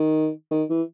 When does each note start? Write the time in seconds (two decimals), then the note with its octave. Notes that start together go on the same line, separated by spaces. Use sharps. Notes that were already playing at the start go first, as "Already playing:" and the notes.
Already playing: D#3
0.51 D#3
0.69 E3